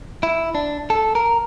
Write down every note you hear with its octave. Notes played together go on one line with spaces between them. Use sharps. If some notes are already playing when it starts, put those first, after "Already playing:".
E4
D4
A4
A#4